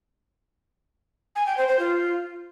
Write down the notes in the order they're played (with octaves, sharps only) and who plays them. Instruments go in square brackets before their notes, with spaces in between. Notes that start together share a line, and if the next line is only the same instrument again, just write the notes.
[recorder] G#5
G5
C5
C5
F4